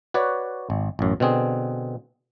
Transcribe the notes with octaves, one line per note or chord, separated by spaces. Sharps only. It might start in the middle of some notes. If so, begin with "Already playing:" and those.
F#4 B4 C#5 D5
G#1
A1 F#2
B2 D3 C4 G#4